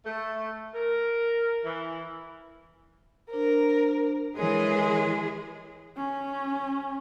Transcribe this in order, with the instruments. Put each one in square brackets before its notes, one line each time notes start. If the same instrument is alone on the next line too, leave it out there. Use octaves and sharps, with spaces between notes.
[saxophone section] A3
A#4
E3
[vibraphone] D4 C5 [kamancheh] A#4
[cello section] E3 G#4 [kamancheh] G#3 [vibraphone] A#4 C#5
[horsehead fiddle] C#4